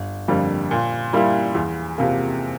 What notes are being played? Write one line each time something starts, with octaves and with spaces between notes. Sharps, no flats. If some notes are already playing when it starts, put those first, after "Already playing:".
Already playing: G1
F2 D3 G3 A#3
A#2
G3 A#3 E4
E2
C3 F3 A#3